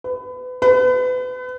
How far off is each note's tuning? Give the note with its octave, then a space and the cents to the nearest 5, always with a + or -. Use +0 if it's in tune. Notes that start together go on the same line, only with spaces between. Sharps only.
B4 +30
B4 +35